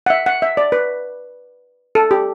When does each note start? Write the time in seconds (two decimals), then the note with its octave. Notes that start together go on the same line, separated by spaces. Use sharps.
0.06 F#5
0.10 E5
0.26 F#5
0.42 E5
0.57 D5
0.72 B4
1.95 A4
2.11 G4